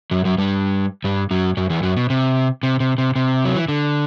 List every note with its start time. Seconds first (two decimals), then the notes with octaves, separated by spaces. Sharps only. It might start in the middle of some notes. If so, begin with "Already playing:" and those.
0.11 F#2 F#3
0.25 F#2 F#3
0.38 G2 G3
1.04 G2 G3
1.31 F#2 F#3
1.57 F#2 F#3
1.70 E2 E3
1.83 F#2 F#3
1.97 B2
2.10 C3
2.63 C3
2.80 C3
2.98 C3
3.16 C3
3.45 F#3
3.56 E3
3.68 D3